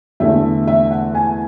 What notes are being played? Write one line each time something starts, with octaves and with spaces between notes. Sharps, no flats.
E2 D3 A3 E5
E5
F#5
G#5